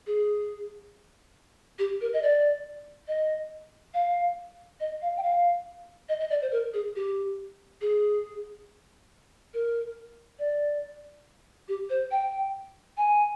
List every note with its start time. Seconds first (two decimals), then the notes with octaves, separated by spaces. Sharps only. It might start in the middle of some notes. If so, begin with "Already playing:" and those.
0.07 G#4
1.79 G4
2.01 A#4
2.13 D#5
2.22 D5
3.08 D#5
3.94 F5
4.80 D#5
5.02 F5
5.17 G5
5.23 F5
6.09 D#5
6.20 D#5
6.30 D5
6.42 C5
6.52 A#4
6.74 G#4
6.96 G4
7.81 G#4
9.54 A#4
10.39 D5
11.68 G4
11.90 C5
12.11 G5
12.97 G#5